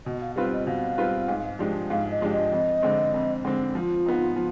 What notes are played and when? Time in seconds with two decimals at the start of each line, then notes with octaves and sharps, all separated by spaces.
0.06 B2 D#5
0.21 F5
0.36 G3 C4 F4 B4 F5
0.52 D#5
0.67 B2 F5
0.98 G3 C4 F4 B4
1.28 G#2
1.59 F3 G#3 D4 G4
1.90 G#2 F5
2.10 D#5
2.21 F3 G#3 D4 G4
2.32 D#5
2.52 F2
2.82 D3 G#3 C4
3.14 F2
3.44 D3 G#3 C4
3.75 F3 F4
4.06 B3 D#4
4.36 F3